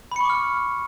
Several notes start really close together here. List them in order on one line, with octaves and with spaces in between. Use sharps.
B5 C#7 C#6 D6 F6